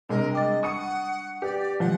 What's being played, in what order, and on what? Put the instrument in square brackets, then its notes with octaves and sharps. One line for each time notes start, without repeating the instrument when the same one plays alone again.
[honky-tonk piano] C3 G#3 [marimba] G3 D4 [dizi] A#4
[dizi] D#5 [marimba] G5 D6 A6
[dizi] F#5 [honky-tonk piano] C#6 D#6 C#7
[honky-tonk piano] G4 [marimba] B4 [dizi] D5
[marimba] D#3 F#3 G#3 [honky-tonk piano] F3 [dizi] F#5